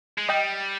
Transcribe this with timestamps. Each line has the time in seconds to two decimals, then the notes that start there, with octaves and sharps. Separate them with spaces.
0.18 G#3
0.29 G3 D#5 G5